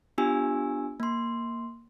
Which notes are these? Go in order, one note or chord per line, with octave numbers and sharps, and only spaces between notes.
B3 D4 F4 G4 G#5 E6
A#3 C6